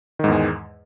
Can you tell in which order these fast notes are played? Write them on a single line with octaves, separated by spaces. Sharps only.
D#3 G#2 E2 G#3